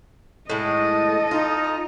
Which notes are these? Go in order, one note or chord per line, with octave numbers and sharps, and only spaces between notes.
A2 G#3 A4 D#5
D#4 F4